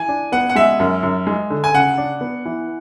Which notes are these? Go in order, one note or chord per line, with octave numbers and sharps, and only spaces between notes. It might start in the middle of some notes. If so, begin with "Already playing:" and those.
Already playing: E3 G#5
D4
B3 F#5
F#5
G#3 E5
F#2
F#2
G#3
D3
G#5
C#3 F#5
D4
B3
E3